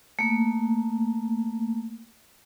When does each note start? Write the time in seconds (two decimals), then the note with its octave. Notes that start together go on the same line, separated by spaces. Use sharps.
0.19 A3 A#3